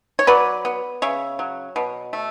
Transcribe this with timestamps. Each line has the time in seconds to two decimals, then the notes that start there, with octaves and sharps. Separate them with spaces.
0.19 C#5
0.27 F#3 B4 D5
0.65 B3
1.02 C#3 C#5 E5
1.39 F#3
1.76 B2
2.13 A3